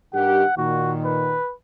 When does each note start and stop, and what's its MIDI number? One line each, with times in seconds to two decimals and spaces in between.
0.14 0.44 43
0.14 0.44 51
0.14 0.44 67
0.14 0.54 78
0.58 1.38 46
0.58 1.38 51
0.58 0.92 66
1.05 1.53 71